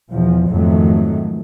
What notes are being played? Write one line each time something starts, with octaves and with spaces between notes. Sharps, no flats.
E2 B2 F3
F2 G#2 D#3 F#3 A3